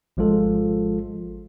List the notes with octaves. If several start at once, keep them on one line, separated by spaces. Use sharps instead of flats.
G#1 F3 G#3 F4 A4